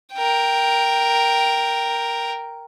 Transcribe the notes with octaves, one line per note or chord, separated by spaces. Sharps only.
A#4 G5